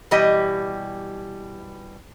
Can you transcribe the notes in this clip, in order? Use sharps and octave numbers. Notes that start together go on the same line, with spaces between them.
B2 E3 G3 G4 D#5